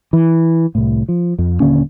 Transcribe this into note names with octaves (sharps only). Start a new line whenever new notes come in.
E3
C2 A2
F3
F2
D#1 D3 A#3 C#4